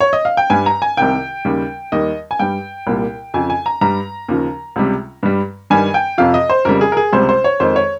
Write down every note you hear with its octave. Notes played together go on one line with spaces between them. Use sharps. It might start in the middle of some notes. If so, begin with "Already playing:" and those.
C#5
D#5
F5
G5
G2 G3 G#5
A#5
G#5
C2 C3 D#3 G5
D#2 C#3 G3
D#2 D#3 G3 D#5
G#5
G2 G3 G5
C2 A#2 G3
F2 C#3 F3 G#5
G#5
A#5
G2 G3 A#5
D#2 C#3 F3
C#2 C3 G3
G2 G3
G2 D#3 G3 G#5
G5
F2 C3 F3 F5
D#5
C5
F2 C#3 G3 A#4
G#4
A#4
G#4
C#2 C3 G3 C5
C5
C#5
F2 D#3 G#3 C5
C#5